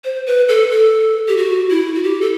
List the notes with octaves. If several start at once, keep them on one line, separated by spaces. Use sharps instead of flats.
C5
B4
A4
A4
G4
F#4
E4
F#4
G4
A4